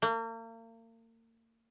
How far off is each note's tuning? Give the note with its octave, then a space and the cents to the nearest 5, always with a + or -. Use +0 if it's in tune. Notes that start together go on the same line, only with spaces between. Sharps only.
A#3 -40